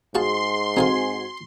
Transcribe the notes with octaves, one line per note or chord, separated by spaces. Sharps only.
G#2 F#4 G#4 F5 A5 C6
C4 D#4 F#4 A4 F5 G#5